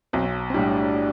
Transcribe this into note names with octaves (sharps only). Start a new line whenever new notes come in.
B1 C4
C4
A2 G3 D4